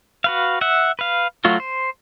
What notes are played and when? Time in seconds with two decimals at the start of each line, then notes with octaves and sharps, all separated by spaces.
0.24 F#4 B4 F5
0.61 E5 F#5
0.99 B4 F5
1.44 F#3 A3 F4 F#4
1.60 C5